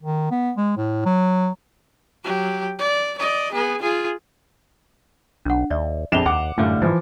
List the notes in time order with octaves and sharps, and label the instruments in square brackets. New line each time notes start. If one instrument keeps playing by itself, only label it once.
[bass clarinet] D#3
B3
G#3
A2
F#3
[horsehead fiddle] F#3 G4
D5
D5 D#5
B3 G#4
F4 G#4
[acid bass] B1 [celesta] D4 F#5
[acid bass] D#2 [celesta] D5 E5
[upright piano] A#1 F2 E7 [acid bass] D4 [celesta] C7 F7 G7
[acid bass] D#2 [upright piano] F#5 D6
[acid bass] F#2 [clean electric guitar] A2 D3 G3 [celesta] E5 F5
[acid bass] G#2 [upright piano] E3 F3